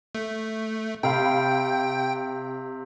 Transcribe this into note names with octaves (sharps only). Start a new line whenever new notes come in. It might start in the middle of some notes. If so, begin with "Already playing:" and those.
A3
C3 F5 G5 B5